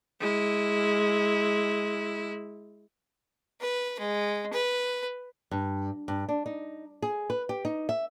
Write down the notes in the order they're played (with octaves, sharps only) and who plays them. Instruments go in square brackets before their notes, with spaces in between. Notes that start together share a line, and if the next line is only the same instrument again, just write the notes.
[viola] G#3 E4
[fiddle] B4
G#3
B4
[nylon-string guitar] G2
G2
D4
D#4
G#4
B4
G4
D#4
E5